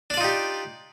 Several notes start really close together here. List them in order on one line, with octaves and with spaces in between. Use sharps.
D4 D5 F4 D#4 G4